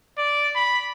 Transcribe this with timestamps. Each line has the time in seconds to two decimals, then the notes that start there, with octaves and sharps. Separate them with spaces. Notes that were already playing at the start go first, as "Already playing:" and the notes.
0.18 D5
0.56 B5